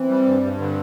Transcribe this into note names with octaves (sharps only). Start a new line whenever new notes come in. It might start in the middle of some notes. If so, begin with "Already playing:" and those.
Already playing: E3 C4
G3
G2
G2
D3